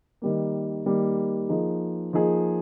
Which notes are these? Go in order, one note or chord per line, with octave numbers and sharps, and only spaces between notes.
D#3 G3 A#3
D#3 G3 A#3
F3 A#3 D#4 G#4
F3 A#3 D#4 G#4